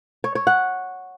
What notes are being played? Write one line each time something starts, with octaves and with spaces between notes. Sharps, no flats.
C#5
C#5
F#5